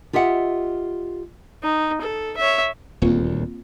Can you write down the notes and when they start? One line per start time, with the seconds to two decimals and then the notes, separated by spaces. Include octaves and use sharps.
0.13 F4 G4 D#5 E5 F#5
1.63 D#4
2.01 A4
2.37 C#5 E5
3.02 D#1 D2 A#3 C4 F4